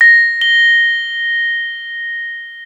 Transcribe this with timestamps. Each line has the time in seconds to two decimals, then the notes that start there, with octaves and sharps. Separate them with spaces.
0.01 A#6
0.41 G7